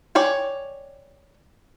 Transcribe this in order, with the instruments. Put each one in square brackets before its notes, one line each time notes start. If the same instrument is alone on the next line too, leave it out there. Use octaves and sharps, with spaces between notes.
[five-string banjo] C#5 D5 G5 G#5